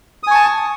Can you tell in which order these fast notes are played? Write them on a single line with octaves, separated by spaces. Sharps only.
D#6 G#5 C#6 A5